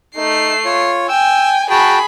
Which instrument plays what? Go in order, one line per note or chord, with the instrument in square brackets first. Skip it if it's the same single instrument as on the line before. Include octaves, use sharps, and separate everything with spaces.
[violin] A3 C7 [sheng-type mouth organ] D#4
[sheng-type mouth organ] F4 C#5
[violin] G5 G#5 [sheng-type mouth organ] E6
[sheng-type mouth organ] F#4 G5 A5 [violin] G#4 B5